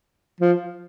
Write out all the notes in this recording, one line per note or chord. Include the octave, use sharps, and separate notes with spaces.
F3